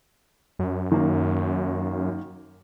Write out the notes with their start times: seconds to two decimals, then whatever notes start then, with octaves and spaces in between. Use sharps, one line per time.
0.59 F#2
0.92 D#3 A#3